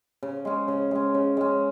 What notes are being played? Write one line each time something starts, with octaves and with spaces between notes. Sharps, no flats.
C#3
G#3 C#4
C#3
G#3 C#4
C#3
G#3 C#4